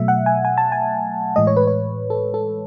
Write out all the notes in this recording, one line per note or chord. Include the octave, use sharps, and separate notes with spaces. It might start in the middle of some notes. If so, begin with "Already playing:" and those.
Already playing: B2 F#3 A3 E5
F#5
G#5
G#5
A5
G#5
A2 E3 G#3 D#5
C#5
B4
C#5
A4
A4